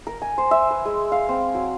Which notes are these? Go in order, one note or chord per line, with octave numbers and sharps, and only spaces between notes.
A#4
G#5
C5
E5
B4
G#3
F5
C4
F#3